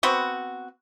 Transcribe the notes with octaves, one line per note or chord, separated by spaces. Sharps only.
B3 C4 F#4